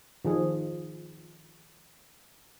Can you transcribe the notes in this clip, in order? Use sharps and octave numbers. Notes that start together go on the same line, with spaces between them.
D#3 F3 G#4